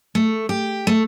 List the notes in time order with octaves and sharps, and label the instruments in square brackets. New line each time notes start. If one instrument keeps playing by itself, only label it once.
[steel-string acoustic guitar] A3
G4
A3